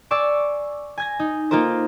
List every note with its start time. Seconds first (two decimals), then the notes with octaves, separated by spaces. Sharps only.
0.11 D5 G#5 C#6 D6 E6 C7
0.98 G#5 G#6 A#6
1.20 D#4
1.51 A#3 D#4 F4 A#4 C5